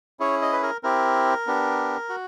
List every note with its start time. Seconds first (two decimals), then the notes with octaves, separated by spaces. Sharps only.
0.20 C#4 E4 G#4 C#5
0.42 D#5
0.53 B4
0.63 A#4
0.83 C4 E4 G4 A#4
1.47 B3 D4 G4
2.09 F#4